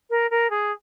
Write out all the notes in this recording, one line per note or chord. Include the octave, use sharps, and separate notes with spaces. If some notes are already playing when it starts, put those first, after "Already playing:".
A#4
A#4
G#4